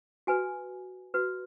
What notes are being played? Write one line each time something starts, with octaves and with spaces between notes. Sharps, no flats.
F#4 B4 G#5
F#4 B4